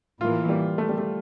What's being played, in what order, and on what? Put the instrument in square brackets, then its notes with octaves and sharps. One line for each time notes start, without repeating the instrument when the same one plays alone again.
[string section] A2 E3 A#3 [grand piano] F4
[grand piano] G3
A3
G3
A3